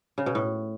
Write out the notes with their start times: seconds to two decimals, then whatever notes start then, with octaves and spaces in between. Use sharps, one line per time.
0.18 C#3
0.26 B2
0.35 A2